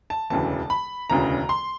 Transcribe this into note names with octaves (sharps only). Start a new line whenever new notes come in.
A5
E1 D2 C#3 E3 A5
B5
E1 D2 C#3 E3 A#5
C6